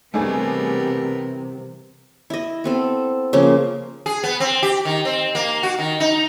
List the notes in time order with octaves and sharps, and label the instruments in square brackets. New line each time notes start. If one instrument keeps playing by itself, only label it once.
[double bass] C3 E3 [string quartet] G3 B3 A#4 [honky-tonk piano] A3 D4 G#4
[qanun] E4 D#5
B3 C4 A4
C#3 F3 A#3
[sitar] G#4
B3
C4
G4
D#3
C4
A#3
F#4
D#3
D#4